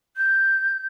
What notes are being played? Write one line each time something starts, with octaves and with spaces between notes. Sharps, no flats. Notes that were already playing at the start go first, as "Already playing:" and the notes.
G6